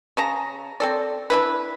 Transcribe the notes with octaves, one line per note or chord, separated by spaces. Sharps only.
C#3 A5 A#5
C4 A4 D5
D4 E4 B4